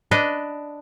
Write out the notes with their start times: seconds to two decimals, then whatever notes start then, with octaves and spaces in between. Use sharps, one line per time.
0.11 D4 B4 D#5